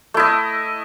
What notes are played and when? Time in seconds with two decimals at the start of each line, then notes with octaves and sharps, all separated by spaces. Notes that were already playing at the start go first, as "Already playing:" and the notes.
0.14 A3
0.17 E4
0.20 D#5